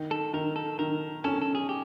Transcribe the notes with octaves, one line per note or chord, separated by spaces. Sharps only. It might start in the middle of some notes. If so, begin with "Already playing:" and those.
Already playing: D#3
A4
D#3 A#4
A4
D#3 A#4
C#4 A4
A4
G#4
G4